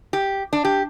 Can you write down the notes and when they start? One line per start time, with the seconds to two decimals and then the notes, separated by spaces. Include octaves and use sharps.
0.13 G4
0.53 D4
0.65 G4